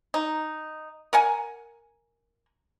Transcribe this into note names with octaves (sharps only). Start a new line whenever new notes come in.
D#4
A#4 F#5 G#5